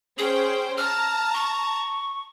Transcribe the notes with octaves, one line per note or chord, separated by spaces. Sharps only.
C#4 G#4 C5 G5
A5 A#5 F6
C#6